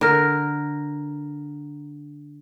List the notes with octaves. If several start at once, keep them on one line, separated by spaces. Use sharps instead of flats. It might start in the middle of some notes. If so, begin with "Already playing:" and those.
D3 A#4